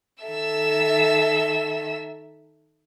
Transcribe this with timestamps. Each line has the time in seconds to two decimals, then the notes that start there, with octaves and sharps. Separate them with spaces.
0.23 D#3 A4 E5 E6